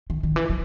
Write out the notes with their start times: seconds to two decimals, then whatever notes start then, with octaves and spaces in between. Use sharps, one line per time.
0.10 D#3
0.23 D#3
0.36 E3
0.50 F#3